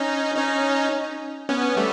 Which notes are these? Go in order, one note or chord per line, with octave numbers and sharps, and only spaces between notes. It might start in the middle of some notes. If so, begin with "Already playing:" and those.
Already playing: C#4 D#4
C#4 D#4
B3 C#4
G3 A3